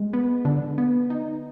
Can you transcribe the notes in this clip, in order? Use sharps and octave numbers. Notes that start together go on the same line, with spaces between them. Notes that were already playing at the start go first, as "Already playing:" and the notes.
Already playing: G#3
B3
D3
B3
D#4